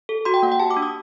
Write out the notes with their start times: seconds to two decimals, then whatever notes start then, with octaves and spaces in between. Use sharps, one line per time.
0.09 A4
0.25 F#4 C6
0.34 G5
0.43 A#3 F#5
0.52 G5
0.60 G4 A5
0.71 D6
0.77 D4
0.82 D#6